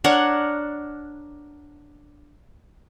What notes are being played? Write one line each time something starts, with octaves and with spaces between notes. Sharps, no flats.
D4 A#4 C#5 F#5